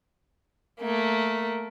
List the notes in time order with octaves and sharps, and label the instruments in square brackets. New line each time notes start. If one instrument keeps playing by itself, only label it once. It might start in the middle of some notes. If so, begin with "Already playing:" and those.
[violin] A3 A#3